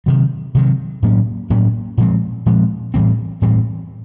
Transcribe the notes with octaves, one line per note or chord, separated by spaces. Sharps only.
C3 D#3 F#3
C3 D#3 F#3
A2 F#3 A#3 C#4
A2 F#3 A#3 C#4
A#2 F3 G#3 C4
A#2 F3 G#3 C4
A2 E3 G3 C4
A2 E3 G3 C4